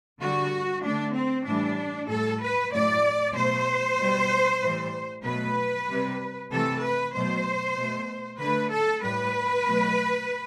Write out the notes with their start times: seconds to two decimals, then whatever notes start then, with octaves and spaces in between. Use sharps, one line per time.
0.21 D3 G3 F#4
0.84 D3 A3 D4
1.15 C4
1.47 A2 E3 G3 D4
2.10 A2 G3 A4
2.42 B4
2.73 A2 F#3 A3 D5
3.36 B2 F#3 A3 C5
3.99 B2 G3
4.63 A2 E3 G3
5.25 B2 F#3 A3 B4
5.88 C3 G3
6.52 C3 E3 A3 A4
6.83 B4
7.14 B2 F#3 A3 C5
7.77 B2 A3
8.41 D3 A3 B4
8.72 A4
9.03 A2 G3 B4
9.66 B2 F#3 A3